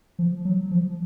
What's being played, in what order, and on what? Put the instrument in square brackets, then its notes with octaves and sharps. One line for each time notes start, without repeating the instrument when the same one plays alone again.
[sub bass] F3
F#3
F3